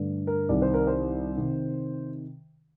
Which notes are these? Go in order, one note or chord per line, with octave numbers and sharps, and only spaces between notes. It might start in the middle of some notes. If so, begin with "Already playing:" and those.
Already playing: G2 D3 A3
A#4
C2 C3 D#3 D5
C5
A#4
C5
C3 D#3